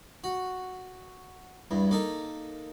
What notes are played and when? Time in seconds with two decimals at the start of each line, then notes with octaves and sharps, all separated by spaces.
0.24 F#4
1.71 E2 G2
1.91 A#3 D#4 A4